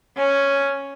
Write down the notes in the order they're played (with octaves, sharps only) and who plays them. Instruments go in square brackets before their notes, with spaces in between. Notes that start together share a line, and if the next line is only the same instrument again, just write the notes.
[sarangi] C#4